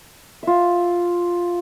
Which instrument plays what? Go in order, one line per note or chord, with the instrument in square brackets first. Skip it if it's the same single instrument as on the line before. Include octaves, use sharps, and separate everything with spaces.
[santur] F4 E5